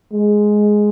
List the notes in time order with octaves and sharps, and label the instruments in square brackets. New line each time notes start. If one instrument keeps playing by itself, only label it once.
[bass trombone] G#3